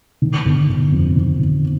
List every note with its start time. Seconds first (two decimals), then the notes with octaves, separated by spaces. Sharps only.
0.22 D#3
0.45 G1
0.69 G1
0.92 F2
1.16 D#3
1.39 G1